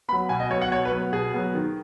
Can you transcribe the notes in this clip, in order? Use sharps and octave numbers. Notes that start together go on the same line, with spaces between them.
F#3 B3 B5
B2 G#5
D#5
F#3 B3 C#5
F#5
B2 C#5
B4
F#3 B3
B2 G#4
F#3 B3
D#3